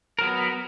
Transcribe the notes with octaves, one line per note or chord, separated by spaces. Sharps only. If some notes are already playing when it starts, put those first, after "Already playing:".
F#3 B3 A#4